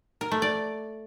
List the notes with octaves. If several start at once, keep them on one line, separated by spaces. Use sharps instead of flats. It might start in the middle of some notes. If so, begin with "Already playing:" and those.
A#4
A3
D5